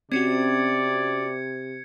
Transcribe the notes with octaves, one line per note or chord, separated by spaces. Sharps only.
C3 C4 C#4 F#4 D5 G#6 C#7